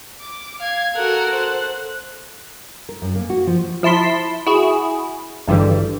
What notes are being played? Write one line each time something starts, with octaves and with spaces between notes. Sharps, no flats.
D6
F5 G#6
F#4 A4 A#4 F#6
C5
A#4
F#2
A#3
F#4
F3
F3 E4 A5 C6 B6
E4 F#4 G#4
G#1 G2 D3 E3 G3